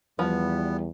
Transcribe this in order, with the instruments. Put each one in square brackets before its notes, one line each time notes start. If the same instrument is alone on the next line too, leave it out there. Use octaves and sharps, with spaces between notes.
[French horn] E2 [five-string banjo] F3 [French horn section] G3 [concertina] B3